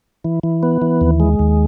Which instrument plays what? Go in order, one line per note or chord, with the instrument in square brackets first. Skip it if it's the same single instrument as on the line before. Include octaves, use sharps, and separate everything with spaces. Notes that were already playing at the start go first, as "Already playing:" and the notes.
[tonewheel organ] E3
E3
B3
E3
D#2
G#3
D#2